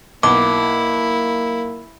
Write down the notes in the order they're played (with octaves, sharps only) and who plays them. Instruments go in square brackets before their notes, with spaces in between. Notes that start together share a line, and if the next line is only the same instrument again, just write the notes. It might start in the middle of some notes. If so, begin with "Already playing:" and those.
[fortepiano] B1 [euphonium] A#3 [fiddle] E4 [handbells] D6